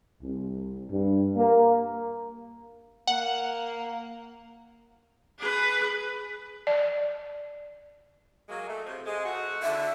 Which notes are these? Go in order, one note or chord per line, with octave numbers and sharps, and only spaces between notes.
C2
G2
A#3
A#3 F#5
G#4 B4
D5
F#3 G#3 A#3
A3
C3 F3
G#3
A3 F#4
D3 E5